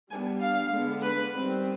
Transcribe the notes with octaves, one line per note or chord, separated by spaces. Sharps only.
G3 B3 D4 G#5
F5
D3 G#3 B3 D4
B4
D#3 G3 C4